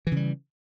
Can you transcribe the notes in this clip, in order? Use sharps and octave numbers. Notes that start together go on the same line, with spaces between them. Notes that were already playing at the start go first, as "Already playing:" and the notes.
C#3 E3 G3